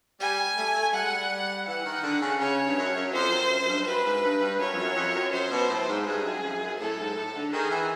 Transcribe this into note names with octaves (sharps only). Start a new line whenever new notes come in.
G3 G#5
A3
A3
G3 F#5
G#3
G3
E3 F#5
D#3
D3
C#3
C#3 C#5
G2
F#2
F#2
F2 C5
F#2
F#2
F#2
G2
G2
F#2 B4
G#2
G2
G2
F#2 C#5
F2
F#2
F2
F#2
F#2 C5
B2
A2
G#2
G2 G#4
F#2
F2
F#2
A2 A4
G#2
A2
D3
D#3 G#4
E3